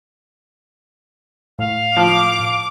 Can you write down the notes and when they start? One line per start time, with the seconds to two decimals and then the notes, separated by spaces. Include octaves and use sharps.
1.59 A2 F5
1.97 F3 D6